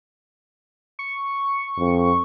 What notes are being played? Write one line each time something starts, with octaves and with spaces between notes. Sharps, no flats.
C#6
F2